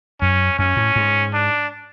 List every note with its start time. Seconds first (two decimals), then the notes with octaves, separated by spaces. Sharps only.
0.21 F#2 C#4
0.58 F#2 C#4
0.77 A2
0.96 G#2
1.34 D4